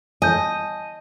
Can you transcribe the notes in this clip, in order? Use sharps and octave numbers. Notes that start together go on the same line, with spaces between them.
D#5 G#5 A5 G6